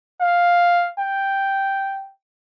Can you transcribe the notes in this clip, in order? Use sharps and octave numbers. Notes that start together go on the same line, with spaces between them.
F5
G5